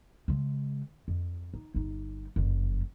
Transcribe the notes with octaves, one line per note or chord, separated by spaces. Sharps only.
C#3 G#3
F2
D#4
G1 D#4
F#1 F2